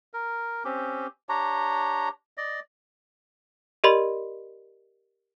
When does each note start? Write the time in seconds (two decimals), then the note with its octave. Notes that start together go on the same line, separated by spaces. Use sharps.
0.14 A#4
0.65 C4 C#4 G4
1.29 D4 G4 C#5 A#5
2.37 D5 D#5
3.84 G4 A#4 D5 D#5 B5 C6